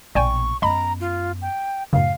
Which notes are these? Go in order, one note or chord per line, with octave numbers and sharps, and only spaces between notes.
A#1 B2 D5 G5 G#5 C#6
F#2 B3 D#5 A#5 B5
F4
G5
F#2 A2 C#3 F5